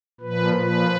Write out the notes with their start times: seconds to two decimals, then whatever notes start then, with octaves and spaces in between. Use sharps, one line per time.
0.21 A#2 F3 B4
0.54 A#2 F3 B4